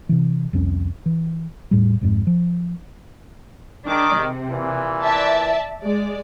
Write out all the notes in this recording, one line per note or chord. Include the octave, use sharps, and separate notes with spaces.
C3 E3
C2 F2 C#4
E3
E2 A2 G3
G#1 F2 G#2
F3
D#3 D4 G#4 D6
C3
A#2 E3
D5 E5 A5
G#3 D5